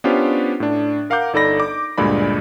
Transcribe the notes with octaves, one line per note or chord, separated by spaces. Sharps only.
B3 C#4 D4 F4 G4 C5
A2 D4
A#4 F5 F#5 A#5 D6 G6
G1 D#4 A4 D5 B5 A#6
D6
D2 G2 A#2 G#3 D5 B5